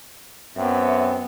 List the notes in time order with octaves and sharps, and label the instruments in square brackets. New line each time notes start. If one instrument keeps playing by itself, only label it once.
[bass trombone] F#2 [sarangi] B3 [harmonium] C4 [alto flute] E5